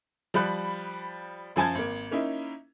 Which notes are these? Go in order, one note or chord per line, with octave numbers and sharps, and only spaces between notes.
F3 G3 B5 F#6
F#2 F3 G#5 A5 G#6
G#1 A#3
A#3 C#4 D#4 E4